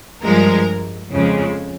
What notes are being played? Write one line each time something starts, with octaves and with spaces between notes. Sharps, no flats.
G2 F3 G#3 A#4
F2 C#3 G#3